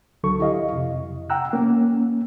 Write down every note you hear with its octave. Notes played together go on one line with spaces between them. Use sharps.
C#2 D3 F#3 A4 C#6
E4 G4 D#5 F5
F2 C3
F#5 G5 A#5 E6 F#6
A#3 C#4